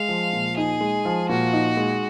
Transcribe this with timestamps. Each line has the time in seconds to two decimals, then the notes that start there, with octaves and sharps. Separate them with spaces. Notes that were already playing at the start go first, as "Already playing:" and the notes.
Already playing: G#3 F5
0.09 F3
0.33 A#2
0.57 D#4 G#4
0.81 G#3
1.05 F3
1.29 A#2 F#4
1.53 D#4
1.77 G#3